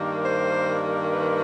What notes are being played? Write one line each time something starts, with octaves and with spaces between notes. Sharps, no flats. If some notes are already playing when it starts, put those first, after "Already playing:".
Already playing: G2 D#3 G3 A#3
C5
B4